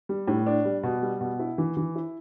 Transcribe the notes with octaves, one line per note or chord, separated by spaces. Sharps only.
G3
A2
D4
G3
B2
G3
B2
E4
E3
E3
E4